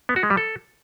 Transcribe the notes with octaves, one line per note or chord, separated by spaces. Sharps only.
B3
F#4
G#3
G3
A4